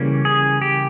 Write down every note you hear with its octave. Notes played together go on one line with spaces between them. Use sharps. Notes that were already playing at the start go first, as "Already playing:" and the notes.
Already playing: C#3 E3 G3 A#3 C#4
G#4
G4